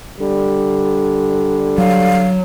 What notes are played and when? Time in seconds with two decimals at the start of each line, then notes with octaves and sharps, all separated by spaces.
0.20 D3 G3
1.78 F#3 F5